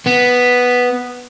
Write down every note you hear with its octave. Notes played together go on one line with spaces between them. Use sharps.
B3